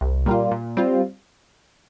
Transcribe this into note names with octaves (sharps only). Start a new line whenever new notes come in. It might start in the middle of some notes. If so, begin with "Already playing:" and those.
C2
A#2 G3 A#3 F4
A#2
G3 C4 F4